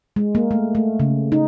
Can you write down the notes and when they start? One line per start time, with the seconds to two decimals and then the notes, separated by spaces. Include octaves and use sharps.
0.16 G#3
0.35 A#3
0.51 A3
0.75 A3
1.00 C#3
1.32 D#4